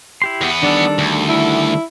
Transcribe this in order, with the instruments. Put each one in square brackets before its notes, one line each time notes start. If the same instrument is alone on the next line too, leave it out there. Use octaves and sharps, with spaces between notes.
[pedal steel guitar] E4 G4 C6
[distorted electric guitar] E2 B3
[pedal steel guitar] D#3 G3 A4 [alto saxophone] D4
[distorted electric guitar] D2
[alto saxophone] E4